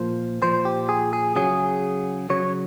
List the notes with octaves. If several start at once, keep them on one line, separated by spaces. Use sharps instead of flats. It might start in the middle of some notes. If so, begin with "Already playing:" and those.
Already playing: A#2 F3 C5
A#2 F3 C5
G4
G#4
G#4
C#3 F#3 G#4
C#3 F#3 C#5